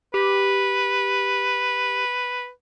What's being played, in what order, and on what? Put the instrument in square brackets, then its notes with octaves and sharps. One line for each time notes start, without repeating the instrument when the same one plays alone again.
[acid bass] G4 [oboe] B4